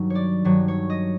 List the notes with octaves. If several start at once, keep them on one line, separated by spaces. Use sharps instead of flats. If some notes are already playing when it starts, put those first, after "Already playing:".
Already playing: G2 D#3 F#3
C#5
D5
G2 D#3 F#3 C#5
C#5
D#5